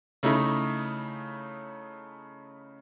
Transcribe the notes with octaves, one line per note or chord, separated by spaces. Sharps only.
C#3 A3 D#4 E4